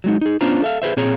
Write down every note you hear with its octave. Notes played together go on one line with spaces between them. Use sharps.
F#3 G#3 D#4
D#4 G#4
B3 C#4 D4 F4 C5 A#5
A4 E5 F5
G#4 B4 C5 E5
A#2 C4 G#4 C#5 A#5